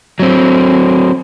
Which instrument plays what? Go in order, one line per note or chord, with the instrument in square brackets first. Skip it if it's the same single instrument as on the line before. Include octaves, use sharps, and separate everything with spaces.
[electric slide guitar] F#3 C4